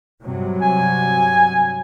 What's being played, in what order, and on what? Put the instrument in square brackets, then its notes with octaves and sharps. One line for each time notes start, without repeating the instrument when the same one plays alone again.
[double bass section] G2 C3 F#3
[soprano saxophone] G#5